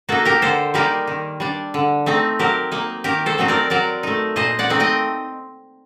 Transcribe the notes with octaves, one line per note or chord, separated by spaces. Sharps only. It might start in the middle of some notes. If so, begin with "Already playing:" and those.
A#3 D#4 F#4 A4
G4 A#4
D3 A4 C5
G3 A#3 D#4 G4 A#4
D#3
G3 D4
D3
A3 C4 D#4
F#3 G4 A#4
A#3 D#4
D#3 G4 A#4
A4 C5
F#3 A3 C4 D#4
A#4 D5
F#3 A#4 D5
A3 D#4
A#2 C5 D#5
D5 F#5
A3 C4 D#4
D#5 G5